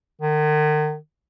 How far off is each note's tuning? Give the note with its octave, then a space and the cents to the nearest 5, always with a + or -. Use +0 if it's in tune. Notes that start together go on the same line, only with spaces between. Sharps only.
D#3 -40